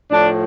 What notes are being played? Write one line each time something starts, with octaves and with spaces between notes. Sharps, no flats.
A2 F3 D4